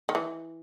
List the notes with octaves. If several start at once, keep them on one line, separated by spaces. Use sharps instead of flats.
D#3
E3